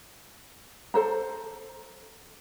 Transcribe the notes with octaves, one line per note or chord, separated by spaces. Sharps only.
A4 C5 A#5